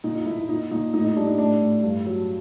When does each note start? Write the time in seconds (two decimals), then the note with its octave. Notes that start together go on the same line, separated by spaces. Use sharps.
0.04 A#2 D#4
0.15 D#4
0.26 A#2 E4
0.38 E4
0.49 A#2 D#4
0.71 A#2 D#4
0.93 A2 D#4
1.04 D#4
1.16 G3 D4
1.27 D#4
1.38 A2 D4
1.61 A2
1.83 G2
2.06 F#3